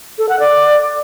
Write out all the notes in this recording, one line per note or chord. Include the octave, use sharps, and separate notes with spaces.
A4
F#5
D5